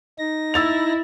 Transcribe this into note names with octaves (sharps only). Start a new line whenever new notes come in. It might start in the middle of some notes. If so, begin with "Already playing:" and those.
D#4 A#6
E4 E6 A6 F7